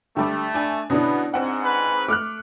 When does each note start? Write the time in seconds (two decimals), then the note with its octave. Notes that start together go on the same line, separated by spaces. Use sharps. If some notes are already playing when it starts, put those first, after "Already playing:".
0.17 D3 G3 A3 G5 B5 D6
0.54 D4 G#5
0.90 B2 D3 B3 C#4 D4 E4
1.34 G#2 C4 F#5
1.65 B4
2.08 A3 D6 F6 F#6